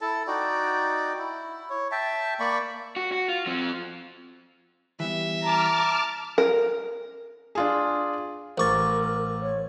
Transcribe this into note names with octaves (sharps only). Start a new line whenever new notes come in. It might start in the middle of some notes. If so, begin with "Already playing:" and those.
E4 A4 A5
D#4 F#4 D5 G5
E4
C#5
E5 G5 A5
A#3 D5 B5 C#6
F#4
F#4
F4
F3 C4
E3 G3 B3 E5
A5 A#5 D6 F6
A#4
D4 F4 G#4
A1 A#4 C5 C#6 D6 A6
C#5